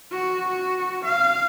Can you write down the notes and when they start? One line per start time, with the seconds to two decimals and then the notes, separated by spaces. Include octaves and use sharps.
0.11 F#4
0.48 F#4
1.04 F5